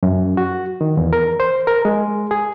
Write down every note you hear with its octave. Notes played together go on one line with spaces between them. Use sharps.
F#2
F#4
D#3
E2
A#4
C5
A#4
G#3
G#4